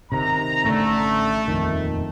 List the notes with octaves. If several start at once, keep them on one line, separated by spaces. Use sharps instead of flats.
C3 D#3 A#5
A1 D3 A3
D#1 F2 D#3